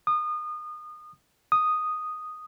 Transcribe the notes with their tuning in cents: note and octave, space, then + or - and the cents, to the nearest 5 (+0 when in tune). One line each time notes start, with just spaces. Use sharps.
D#6 -30
D#6 -5